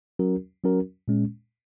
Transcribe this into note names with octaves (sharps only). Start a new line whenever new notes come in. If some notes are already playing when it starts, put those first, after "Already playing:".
F#3 C#4 F#4 A#4
F#3 C#4 F#4 A#4
A#2 G#3 C#4